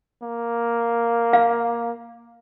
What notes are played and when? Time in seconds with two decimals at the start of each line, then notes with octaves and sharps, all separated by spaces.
0.23 A#3
1.33 F5